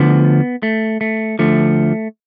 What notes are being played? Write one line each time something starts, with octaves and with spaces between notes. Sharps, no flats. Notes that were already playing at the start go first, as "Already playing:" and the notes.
Already playing: D2 D3 F3 B3
A3
A3
D2 D3 F3 A3